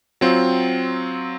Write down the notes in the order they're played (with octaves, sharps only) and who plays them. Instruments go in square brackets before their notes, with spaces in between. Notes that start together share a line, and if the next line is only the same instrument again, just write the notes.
[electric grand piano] F#3 C4 F4